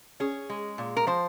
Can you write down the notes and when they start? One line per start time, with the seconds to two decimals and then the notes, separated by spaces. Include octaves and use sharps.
0.20 C#4 G#4
0.50 G#3
0.78 A#2
0.97 A#4
1.07 F3 C5